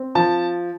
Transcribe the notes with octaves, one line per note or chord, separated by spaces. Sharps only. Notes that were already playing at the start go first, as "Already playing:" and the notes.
Already playing: C4
F3 A5